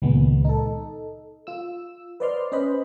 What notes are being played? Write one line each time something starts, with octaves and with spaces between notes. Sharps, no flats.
C#2 A#2 D#3 G#3 B3
D#4 A4
F4 E6
B4 C5 D5 D#5 C6 F6
C#4 B4 C5 D#5 B5